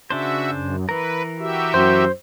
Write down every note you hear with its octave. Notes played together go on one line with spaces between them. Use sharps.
C#3 D4 F#4 C5 E5
F#2
E3 A#4 B4
F#4 G4 E5
F#2 C5